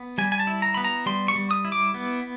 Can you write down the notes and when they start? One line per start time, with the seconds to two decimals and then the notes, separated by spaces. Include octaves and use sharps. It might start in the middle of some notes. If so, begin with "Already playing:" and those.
Already playing: B3
0.18 G3 G#5
0.32 G#5
0.39 A5
0.47 E4
0.62 A#5
0.74 B3 B5
0.85 A#5
1.06 G3 C6
1.28 C#6
1.35 G3
1.51 D#6
1.65 E4
1.72 D6
1.94 B3